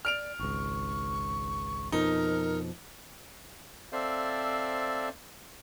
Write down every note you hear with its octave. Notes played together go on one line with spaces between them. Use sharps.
D5 F6 D7 F7
G#1 C#2 C#6
F2 B2 F3 D#4 A#4
C4 A4 C5 D5 E5 F5